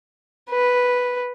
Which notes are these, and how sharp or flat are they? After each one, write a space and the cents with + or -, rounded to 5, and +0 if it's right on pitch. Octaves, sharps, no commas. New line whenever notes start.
B4 +0